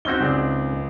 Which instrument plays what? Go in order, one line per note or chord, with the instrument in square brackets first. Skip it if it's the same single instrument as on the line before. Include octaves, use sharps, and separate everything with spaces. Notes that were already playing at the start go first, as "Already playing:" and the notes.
[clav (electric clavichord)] C4 C#4 D#4 [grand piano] F#4 G7
[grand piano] C#2 G#4 D5